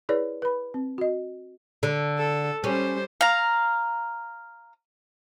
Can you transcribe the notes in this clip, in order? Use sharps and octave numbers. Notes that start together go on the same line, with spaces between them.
E4 G#4 B4 C#5 D5
B4 B5
C4
F#4 D#5
D3
A4
G3 C#4 C5
F5 A#5